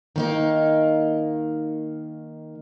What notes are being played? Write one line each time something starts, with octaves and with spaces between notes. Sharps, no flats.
D#3 A#3 D#4